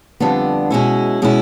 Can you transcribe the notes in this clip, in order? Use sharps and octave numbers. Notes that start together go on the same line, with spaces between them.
F2 D3 G3 B3 D4
B2 G#3 C#4 E4
B2 G#3 C#4 E4